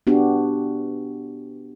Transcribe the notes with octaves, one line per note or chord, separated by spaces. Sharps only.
B3 D4 F#4 G4